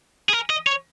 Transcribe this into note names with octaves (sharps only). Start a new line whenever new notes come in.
G#4
A#4
D#5
C#5